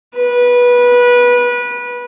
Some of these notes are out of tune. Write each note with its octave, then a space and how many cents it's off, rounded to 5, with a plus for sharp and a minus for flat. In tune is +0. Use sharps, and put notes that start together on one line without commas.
B4 -20